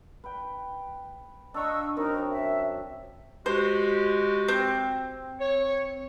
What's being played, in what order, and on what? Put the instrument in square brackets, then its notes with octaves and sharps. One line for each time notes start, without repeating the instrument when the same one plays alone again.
[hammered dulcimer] B4 G5
[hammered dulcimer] D4 F5 A#5 [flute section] D#5 C#6 E6
[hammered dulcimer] F#2 C4 [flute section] D#4 A#4
[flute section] E5
[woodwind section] G#3 F#4 G4 [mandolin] C5
[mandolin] C4
[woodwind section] C#5